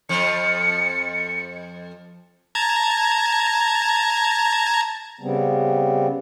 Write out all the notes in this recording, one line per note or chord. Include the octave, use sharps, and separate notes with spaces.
F2 F3 C#7
A5 A#5 G#6
C#3 G3 B3 C4